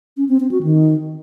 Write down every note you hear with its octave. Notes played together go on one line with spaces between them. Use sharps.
C#4
C4
C4
F#4
D#3